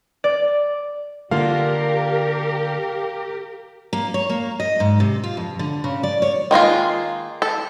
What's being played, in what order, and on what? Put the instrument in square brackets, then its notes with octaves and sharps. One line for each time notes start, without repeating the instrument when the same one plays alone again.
[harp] D5
[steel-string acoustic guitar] D3 A#3 F4 [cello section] G4 A#4 [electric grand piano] F5
[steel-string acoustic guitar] A#3
C#5
A#3
D#5
G#2
C3
F4
F2
D3
C#3
D5
C#5
[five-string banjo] D#3 G#3 A#3 F4
A4